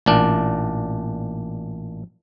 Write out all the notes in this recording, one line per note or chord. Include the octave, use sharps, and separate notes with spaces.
A1 A#2 D4